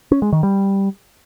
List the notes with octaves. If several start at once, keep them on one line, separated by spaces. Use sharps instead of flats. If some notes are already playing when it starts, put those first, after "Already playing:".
C#4
G#3
D#3
G3